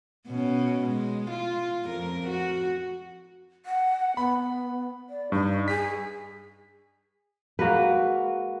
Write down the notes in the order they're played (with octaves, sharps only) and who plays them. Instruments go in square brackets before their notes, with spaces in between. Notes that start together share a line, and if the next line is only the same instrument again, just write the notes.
[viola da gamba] B2 C#4
G#3
F4
F2 A#4
F#4
[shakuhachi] F#5
[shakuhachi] B3 [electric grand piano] B5
[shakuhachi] D5
[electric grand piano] G2 [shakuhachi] D#4
[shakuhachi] G#4 [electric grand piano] B6
[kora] G#3 A#3 F#4 B4